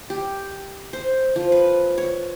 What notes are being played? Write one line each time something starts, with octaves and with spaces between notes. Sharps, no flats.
G4
C5
F3
B4
C#5